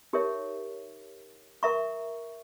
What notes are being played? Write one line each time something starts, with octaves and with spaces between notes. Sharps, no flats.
D#4 G4 A#4 C#5 E5
A#4 E5 A#5 C#6